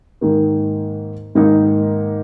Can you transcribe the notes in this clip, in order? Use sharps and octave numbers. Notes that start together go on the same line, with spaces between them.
G#2 D#3 A#3
G#2 D#3 A#3 D#4